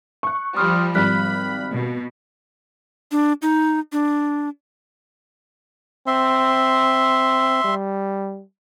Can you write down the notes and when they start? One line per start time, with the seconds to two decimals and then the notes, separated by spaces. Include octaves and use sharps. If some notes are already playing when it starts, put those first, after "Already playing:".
0.23 C#6 F#6
0.56 F3 G3 C6 D#6 F6
0.95 G#1 G3 B5 F6 F#6 B6
1.73 B2
3.12 D4
3.42 D#4
3.92 D4
6.07 C4 E5 C6
7.64 G3